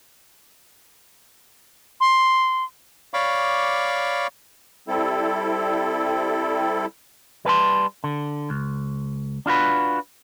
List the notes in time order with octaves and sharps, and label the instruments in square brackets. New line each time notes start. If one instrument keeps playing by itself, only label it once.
[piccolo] C6
[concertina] C#5 D5 F5 B5 C#6 D6
[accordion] G3 C4 E4 A4
[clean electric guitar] G3 B4 A5 C6
D3
C#2
D4 F4 F#4 B4